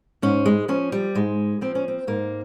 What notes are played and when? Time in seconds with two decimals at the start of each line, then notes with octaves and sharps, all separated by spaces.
0.22 G#2 C#4
0.46 G#3
0.68 F3 C#4
0.92 G3
1.15 G#2 G#3
1.61 F3 C4
1.75 C#4
1.88 C4
2.07 G#2 A#3